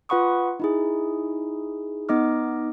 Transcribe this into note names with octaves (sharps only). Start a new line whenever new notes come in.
F4 B4 F#5 B5 C#6 D#6
D#4 E4 G#4
B3 D#4 D#5 D6 F6